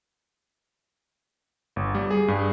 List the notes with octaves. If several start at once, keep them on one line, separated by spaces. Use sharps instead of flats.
G1
G3
G#4
G2